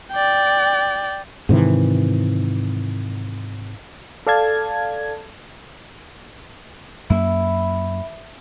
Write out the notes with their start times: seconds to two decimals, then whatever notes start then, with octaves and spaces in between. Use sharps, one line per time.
0.12 D5 G5
1.49 G#2 C3 D#3 E3
4.27 A4 D5 F5 A5 G#6
7.10 F#2 A#3 E4